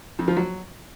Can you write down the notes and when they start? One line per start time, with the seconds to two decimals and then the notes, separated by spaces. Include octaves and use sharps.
0.19 F2
0.28 F3
0.37 F#3